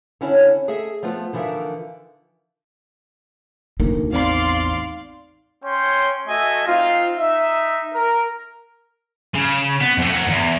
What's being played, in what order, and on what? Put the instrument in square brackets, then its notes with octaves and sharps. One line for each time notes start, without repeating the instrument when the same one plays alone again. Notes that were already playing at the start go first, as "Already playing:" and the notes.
[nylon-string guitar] D3 C#4 E4 C#5 D5
G#4 A4 D#5 E5
F3 A3 B3 F4
D3 E3 F3 D#4 A#4 E5
[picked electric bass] F1 D2 A#3 [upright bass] D#4
[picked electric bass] A1 E2 C4 [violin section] D5 F5 C6
[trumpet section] C#4 C#5 G5 C6
A3 F#4 D#5 E5 G#5
C4 D#4 F4
D#4 E5
A#4
[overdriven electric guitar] C#3
B3
F2 A3
A#4 F#5
E2 G#2